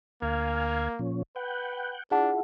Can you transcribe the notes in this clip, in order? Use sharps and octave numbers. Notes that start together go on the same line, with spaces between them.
D2 A#3 F5 G#5
A#2 F3 C#4
B4 F#5 G5
D4 E4 F4 G#4 F#5 A5